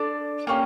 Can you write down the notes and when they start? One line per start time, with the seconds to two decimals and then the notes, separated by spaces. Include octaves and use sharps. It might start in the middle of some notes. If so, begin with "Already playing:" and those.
Already playing: D4 A4 D5
0.47 A#3 C#4 G4